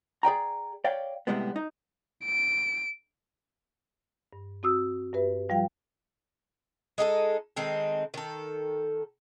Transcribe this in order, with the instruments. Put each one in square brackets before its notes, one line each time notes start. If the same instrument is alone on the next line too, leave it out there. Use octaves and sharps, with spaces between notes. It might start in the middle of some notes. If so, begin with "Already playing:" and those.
[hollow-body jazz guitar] G#4 D5 G5 A#5
C#5 D5 F5 G5
A2 C3 G3 G#3 B3
D#4
[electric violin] D7
[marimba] G2
C4 F#4 D#6 E6
G2 G4 B4 E5
F3 G3 F4 F5 G5
[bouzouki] G#3 D#4 G4 A4
D#3 G#3 C4 A4
D#3 A4